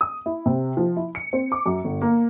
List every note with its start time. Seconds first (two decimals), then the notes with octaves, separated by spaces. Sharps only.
0.01 D#6
0.26 E4
0.46 C3
0.77 F3
0.97 E4
1.15 C#7
1.33 C4
1.52 D6
1.66 F#2
1.84 G1
2.02 A#3